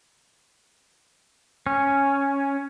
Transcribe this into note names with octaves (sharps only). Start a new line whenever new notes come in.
C#4